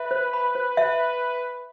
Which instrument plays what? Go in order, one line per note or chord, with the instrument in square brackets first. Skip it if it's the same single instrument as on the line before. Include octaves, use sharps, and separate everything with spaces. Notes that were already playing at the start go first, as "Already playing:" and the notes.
Already playing: [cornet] B4 [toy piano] E5
[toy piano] C5
B5
C5
E5